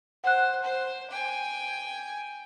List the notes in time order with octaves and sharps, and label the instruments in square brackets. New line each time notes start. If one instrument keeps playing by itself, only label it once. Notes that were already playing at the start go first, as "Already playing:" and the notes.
[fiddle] C5 [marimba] F#5 F#6
[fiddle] C5
G5 G#5